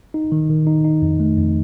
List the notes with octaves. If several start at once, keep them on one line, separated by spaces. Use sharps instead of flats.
D#4
D#3
D#3
D#4
D#4
F2
A3
F2